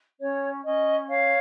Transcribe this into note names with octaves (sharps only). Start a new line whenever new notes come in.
C#4 C#5
C#4 D#5
C#5 F5